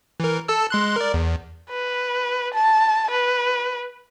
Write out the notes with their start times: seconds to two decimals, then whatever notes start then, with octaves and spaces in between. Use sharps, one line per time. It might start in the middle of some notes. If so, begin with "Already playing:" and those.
0.20 E3 A#4
0.48 A4 A5 E6
0.70 G#3 C6 F#6
0.96 A#4 D5
1.14 E2
1.70 B4
2.54 A5
3.11 B4